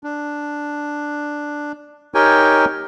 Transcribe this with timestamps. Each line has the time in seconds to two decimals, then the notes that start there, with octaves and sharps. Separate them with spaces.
0.04 D4
2.14 D#4 G4 A#4 C#5 G5 G#5